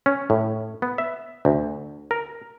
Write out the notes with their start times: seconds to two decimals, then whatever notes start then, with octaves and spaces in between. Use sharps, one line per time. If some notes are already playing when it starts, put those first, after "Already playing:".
0.06 C#4
0.30 A2
0.82 B3
0.98 E5
1.45 D2
2.11 A#4